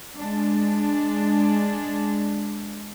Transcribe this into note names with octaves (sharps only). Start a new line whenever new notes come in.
G#3 D4